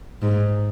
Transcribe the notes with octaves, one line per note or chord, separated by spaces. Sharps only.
G#2